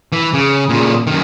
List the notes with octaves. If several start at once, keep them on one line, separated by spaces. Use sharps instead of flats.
E3
C#3
A#2 C#3
F#2 D#3